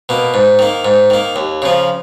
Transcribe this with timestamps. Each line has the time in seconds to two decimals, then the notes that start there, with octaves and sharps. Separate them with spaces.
0.09 B2 A#3
0.34 G#2
0.59 D#3 A#3
0.85 G#2
1.10 D#3 A#3
1.36 D#2
1.62 C#3 F3